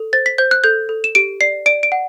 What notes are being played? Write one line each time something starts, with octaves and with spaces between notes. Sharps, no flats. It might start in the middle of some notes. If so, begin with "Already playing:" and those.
Already playing: A4
C5 A6
B6
C5 G6
F#6
A4 G6
A4
E7
G4 D7
D5 C7
D5 D7
D7
F#5